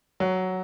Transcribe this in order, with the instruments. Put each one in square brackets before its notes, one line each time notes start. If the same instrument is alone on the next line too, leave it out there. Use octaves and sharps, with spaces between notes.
[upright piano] F#3